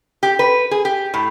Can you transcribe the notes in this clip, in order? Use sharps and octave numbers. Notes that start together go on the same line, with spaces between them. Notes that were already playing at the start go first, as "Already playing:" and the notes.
G4
B4
G#4
G4
A2